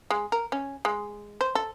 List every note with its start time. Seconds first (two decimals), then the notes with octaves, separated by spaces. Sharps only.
0.10 G#3
0.32 A#4
0.52 C#4
0.85 G#3
1.41 C5
1.55 A4